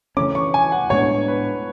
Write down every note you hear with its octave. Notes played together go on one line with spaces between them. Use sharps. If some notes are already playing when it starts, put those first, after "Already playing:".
C#3 E3 A3 C#4 D6
C#6
G#5
F#5
A2 G#3 B3 D4 C#5
B4